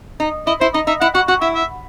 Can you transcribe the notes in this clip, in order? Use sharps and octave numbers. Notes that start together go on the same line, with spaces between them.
D#4
E4 D#5
E4 C5
D#4 D#5
D#4 E5
E4 F#5
F#4 F#5
F#4 F#5
E4 E5
E5